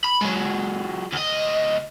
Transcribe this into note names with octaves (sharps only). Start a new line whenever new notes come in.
B5
F#3 G#3
D2 D#5